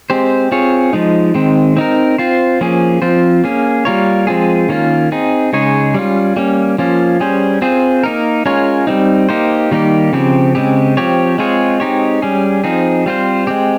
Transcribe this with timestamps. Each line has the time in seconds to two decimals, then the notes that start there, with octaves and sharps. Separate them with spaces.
0.10 G#3 C4 G4 C5
0.52 C4 F4 G#4 C#5
0.93 F3 G#3 D#4
1.35 D#3 G#3 C4
1.77 C4 D#4 A#4
2.18 C4 F4 C5
2.61 F3 A#3 C#4 G#4
3.02 F3 C4 F4 C5
3.44 A#3 C#4 G#4
3.85 G3 A#3 F4 A#4 C#5
4.27 F3 G#3 C4 F4 G#4
4.69 D#3 A#3 C#4 F4
5.12 C4 D#4 G#4
5.53 C#3 G#3 D#4 G#4 C#5
5.94 G3 C#4 F4
6.37 G3 A#3 C#4
6.78 F3 A#3 C#4 F4
7.20 G3 C#4 G#4 C5
7.62 C4 F4 G#4 C5
8.03 A#3 D#4 A#4
8.46 G#3 C#4 F4 A#4 C#5
8.87 G3 C4 D#4
9.29 A#3 D#4 G4 C5
9.71 D#3 G3 A#3 D#4 G4
10.13 C#3 F3 C4 G4
10.55 C#3 G#3 C4 G4
10.97 F3 C4 G4 C#5
11.38 G#3 C4 F4 G#4 C#5
11.80 G#3 C4 D#4 G4 C#5
12.22 G3 C#4 G#4
12.64 F3 C4 D#4 G#4
13.06 G3 C4 F4 C5
13.47 G#3 C4 G4